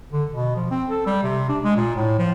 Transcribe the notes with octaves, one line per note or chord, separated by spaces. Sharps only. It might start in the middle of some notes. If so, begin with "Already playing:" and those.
D3
B2
F3
C4
A4
G3
C3
D4
G#3
A#2
A2
F3